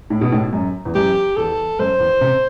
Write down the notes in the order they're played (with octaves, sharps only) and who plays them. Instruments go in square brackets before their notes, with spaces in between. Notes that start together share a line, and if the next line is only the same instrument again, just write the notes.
[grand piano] A2
B2
A2
F#2
E2
[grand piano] F#2 [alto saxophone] G4
[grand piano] E2 [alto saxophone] A4
[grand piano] F#2 [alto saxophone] C5
[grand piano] E2
C3